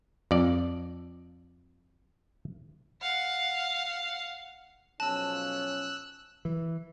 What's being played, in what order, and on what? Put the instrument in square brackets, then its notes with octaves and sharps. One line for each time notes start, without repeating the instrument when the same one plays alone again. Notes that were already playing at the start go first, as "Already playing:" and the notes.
[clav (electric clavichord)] F2 D5
[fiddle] F5 F#5
[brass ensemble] B1 F3 C#4 [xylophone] A5 [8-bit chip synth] E6 F#6
[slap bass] E3